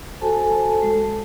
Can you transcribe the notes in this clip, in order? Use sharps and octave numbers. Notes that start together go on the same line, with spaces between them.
F#4 A4 C5 G#5 A5
G#3